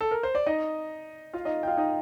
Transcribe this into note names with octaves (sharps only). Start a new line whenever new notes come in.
A4
A#4
C5
D5
D#4 D#5
F4 F5
D#4 D#5
G5
F4 F5
D#4 D#5